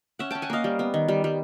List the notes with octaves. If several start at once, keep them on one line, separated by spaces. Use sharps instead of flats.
C#4 E5 F#5
C#4 G5 A5
F#5 G#5
A#3 D#5 F5
G3
B3
D#3
G3
G3